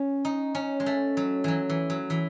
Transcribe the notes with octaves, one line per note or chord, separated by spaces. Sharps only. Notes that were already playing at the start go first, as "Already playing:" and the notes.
Already playing: C#4
D#4
C#4
G#3
A3
F#3
E3 F#3
E3
F#3
E3